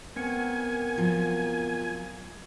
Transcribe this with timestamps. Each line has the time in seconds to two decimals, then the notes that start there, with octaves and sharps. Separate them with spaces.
0.16 B3 C4 A#4 G#5 C#7
0.98 F3 F#3